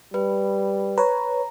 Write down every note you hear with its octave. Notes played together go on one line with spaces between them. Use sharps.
G3 B4
B4 C#5 A#5